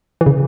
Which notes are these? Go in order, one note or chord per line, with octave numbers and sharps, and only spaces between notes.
E3
C#3